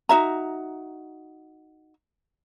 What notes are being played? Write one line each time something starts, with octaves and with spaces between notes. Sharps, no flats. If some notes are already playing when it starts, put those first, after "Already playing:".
D#4 F#4 E5 A#5